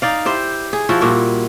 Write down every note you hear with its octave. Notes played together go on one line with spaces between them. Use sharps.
D#4 D5 F5
E4 G4 C5
G#4
F3 E4 F#4
A#2 G3 F#4